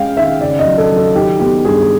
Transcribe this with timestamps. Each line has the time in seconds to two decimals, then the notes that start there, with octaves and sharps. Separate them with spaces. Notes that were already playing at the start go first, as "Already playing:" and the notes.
Already playing: G#3 C#4 F5 G5
0.17 D#3 E5
0.41 C#3 D5
0.59 D#5
0.66 F#3
0.78 A4
0.91 F#3
0.96 A4
1.15 D#3 G4
1.40 B3 G4
1.65 G2 G#4